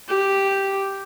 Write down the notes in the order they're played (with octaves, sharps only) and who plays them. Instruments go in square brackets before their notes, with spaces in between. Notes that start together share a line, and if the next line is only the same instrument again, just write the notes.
[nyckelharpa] G4